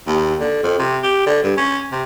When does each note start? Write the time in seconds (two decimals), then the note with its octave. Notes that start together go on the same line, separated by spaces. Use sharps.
0.07 D#2
0.40 D3
0.63 F2
0.79 C3
1.03 G4
1.26 D3
1.43 G2
1.57 C#4
1.92 C3